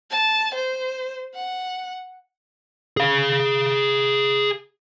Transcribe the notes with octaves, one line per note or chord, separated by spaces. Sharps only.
A5
C5
F#5
G#4 F5